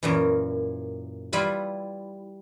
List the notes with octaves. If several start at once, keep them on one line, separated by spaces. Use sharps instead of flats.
F#2 A#2 E3
G3 E4 F4 B4